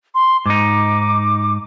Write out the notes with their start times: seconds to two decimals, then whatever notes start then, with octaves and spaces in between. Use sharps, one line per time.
0.15 C6
0.46 G#2 D#4 D6